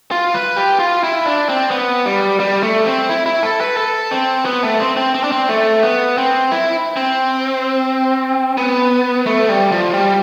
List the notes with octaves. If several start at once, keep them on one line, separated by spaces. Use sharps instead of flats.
F4
B4
G4
F4
E4
D4
C4
B3
G3
G3
A3
C4
E4
E4
A4
B4
A4
C4
B3
A3
C4
C4
C4
D4
C4
A3
B3
C4
E4
C4
B3
A3
G3
F3
G3